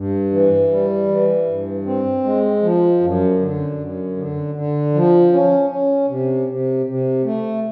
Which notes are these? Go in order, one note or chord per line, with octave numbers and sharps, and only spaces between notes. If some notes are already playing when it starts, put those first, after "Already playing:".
Already playing: G2
E3
G3
E3
G2
C4
G#3
F3
F#2
D3
F#2
D3
D3
F3
C#4
C#4
C3
C3
C3
A3